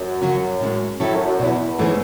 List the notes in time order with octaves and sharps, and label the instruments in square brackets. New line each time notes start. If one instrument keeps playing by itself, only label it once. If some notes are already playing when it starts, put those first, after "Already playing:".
Already playing: [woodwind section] F#2
[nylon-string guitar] C#3 F#3 C#4 F#4
A2 G#3 C#4
[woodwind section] A2 [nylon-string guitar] F#3 C#4 E4 A4
[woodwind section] F#2
F#2
[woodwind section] E2 [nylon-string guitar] B2 F#3 B3 E4
[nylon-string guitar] G#2 E3 A3 C#4 G#4